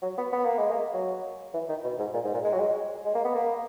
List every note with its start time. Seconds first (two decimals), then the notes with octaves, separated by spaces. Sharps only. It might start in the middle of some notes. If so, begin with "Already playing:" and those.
0.02 F#3
0.18 B3
0.33 B3
0.45 A#3
0.58 G#3
0.71 A#3
0.93 F#3
1.54 E3
1.69 D#3
1.84 B2
1.99 G#2
2.14 A#2
2.24 G#2
2.34 A#2
2.44 G#3
2.53 F#3
2.59 G#3
3.05 G#3
3.15 A#3
3.25 B3
3.35 A#3